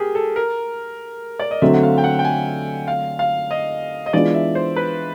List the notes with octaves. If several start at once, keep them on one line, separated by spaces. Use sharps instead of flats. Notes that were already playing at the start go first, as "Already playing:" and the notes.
Already playing: G4 G#4 A#4
A4
A#4
D5
D#5
D3 F#3 A3 C4 E5
F#5
F5
G5
F#5
G5
G#5
F5
F5
D#5
D#5
E3 G#3 B3 D4 F4 D5
E5
C5
B4